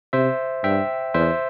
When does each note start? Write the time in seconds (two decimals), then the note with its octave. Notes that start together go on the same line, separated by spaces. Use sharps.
0.13 C3 C5 E5
0.64 G2 E5 G5
1.14 E2 C5 E5